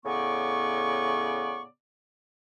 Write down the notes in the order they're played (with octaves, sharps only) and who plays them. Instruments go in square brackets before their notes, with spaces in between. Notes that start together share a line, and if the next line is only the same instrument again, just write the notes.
[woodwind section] A2 C#3 B3 D5 C#6